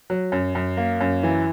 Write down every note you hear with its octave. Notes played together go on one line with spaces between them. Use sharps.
F#3
F#2
F#2
A#3
F#2
E3